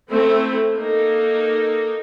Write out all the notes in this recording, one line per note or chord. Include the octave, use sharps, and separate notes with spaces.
A3 C4 E4
A#3 D#4 A4